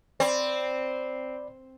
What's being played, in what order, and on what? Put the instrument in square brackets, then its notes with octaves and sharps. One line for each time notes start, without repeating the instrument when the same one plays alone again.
[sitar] C4 [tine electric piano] D5 B5